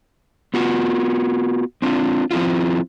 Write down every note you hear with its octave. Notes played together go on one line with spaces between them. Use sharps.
B3 F4 F#4
C4 D4 F4
F3 C4 E4 F4